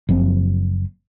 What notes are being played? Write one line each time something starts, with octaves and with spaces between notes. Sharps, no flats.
F#1 F3 C4